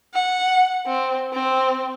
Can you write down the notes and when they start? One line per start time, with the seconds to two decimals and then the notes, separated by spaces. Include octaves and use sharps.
0.14 F#5
0.86 C4
1.33 C4